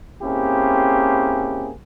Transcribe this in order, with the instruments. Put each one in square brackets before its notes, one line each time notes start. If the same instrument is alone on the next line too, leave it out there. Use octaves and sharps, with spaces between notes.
[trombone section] A#3 C4 C#4 E4 G4 G#4